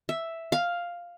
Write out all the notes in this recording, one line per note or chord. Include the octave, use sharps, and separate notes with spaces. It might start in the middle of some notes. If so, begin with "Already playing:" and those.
E5
F5